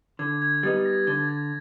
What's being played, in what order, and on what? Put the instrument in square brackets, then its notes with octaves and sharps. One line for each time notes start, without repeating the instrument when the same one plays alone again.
[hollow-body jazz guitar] D3 [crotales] G#6
[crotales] G#6
[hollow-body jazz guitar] G3 B3 D#4 [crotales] A6
[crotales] A6
A#6
[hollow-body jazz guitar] D3 [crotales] A6
[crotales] G#6